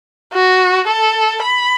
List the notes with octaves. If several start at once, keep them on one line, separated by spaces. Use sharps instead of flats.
F#4
A4
B5